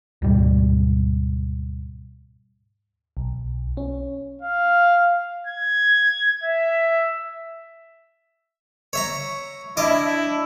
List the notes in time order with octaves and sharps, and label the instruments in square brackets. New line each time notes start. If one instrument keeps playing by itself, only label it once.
[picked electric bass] D2 G#2 B2 G3
[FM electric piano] B1
C#4
[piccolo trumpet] F5
G#6
E5
[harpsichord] C#5 E5 A#5
[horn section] D4 E4 [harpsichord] D#5 D6